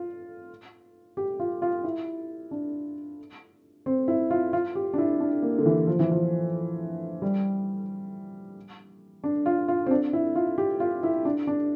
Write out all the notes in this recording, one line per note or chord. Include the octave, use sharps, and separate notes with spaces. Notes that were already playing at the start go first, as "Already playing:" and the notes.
Already playing: F4
G4
F4
F4
E4
D4
C4
E4
F4
F4
G4
D4
E4
D4
A#3
D3
E3
F3
E3
F3
G3
D4
F4
F4
C4
D4
E4
F4
G4
F4
E4
D4
D4